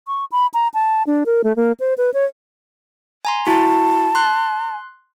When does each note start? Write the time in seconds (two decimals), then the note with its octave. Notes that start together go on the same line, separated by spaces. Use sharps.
0.07 C#6
0.32 B5
0.54 A#5
0.74 A5
1.07 D4
1.26 A#4
1.44 A3
1.56 A#3
1.80 C5
1.98 B4
2.14 C#5
3.25 G#5 A#5 C6
3.47 E4 F#4 A5
4.15 C6 F#6